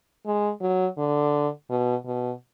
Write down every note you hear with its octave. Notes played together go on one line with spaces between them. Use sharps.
G#3
F#3
D3
B2
B2